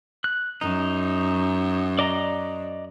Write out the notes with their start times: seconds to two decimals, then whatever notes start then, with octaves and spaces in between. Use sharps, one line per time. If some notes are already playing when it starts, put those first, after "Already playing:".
0.24 F#6
0.61 F#2 D#4
1.99 D5 D#5 A#5